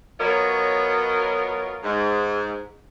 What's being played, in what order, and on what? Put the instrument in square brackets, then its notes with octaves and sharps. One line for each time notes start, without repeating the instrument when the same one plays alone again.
[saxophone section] F#3 B3 F4 A#4 C#5 D#5
G#2